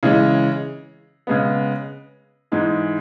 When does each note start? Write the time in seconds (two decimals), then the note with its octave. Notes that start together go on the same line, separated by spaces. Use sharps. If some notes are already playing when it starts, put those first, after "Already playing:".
0.03 C#3 E3 G#3 C#4
1.27 C#3 G#3 B3
2.52 G#2 E3 G#3